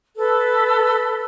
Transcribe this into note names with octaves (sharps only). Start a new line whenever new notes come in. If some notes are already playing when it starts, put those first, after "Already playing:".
A4 B4